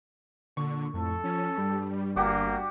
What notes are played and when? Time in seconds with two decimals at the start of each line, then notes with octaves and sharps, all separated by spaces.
0.57 A#2 D3 C#6
0.94 F2 A2 A4
1.24 F3 C#4
1.58 G2 G3
2.16 G1 A#3 D4 F#4 G4